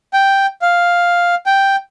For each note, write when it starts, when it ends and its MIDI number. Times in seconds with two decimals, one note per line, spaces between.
0.13 0.46 79
0.62 1.35 77
1.46 1.76 79